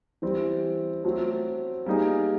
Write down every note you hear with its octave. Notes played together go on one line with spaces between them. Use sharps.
E3 G3 C4
F#3 A3 C4
G3 A#3 D#4 G#4